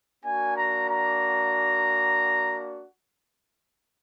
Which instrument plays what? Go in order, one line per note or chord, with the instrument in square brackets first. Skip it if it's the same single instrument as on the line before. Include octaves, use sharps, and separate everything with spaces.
[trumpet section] A#3 D4 F#4 G#5
A#5
A#5